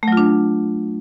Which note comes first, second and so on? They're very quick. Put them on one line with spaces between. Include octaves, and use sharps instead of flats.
A3 F#3 F4 D4